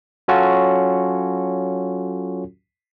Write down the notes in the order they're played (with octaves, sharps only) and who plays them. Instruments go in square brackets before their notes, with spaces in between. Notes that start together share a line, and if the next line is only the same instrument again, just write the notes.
[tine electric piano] F#3 C#4 F4 F#4 A4